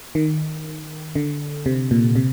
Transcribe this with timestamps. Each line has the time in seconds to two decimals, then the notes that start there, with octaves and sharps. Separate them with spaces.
0.15 D#3
1.15 D3
1.66 C3
1.91 A#2
2.16 C3